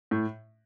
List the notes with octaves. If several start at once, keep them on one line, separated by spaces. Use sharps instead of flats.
A2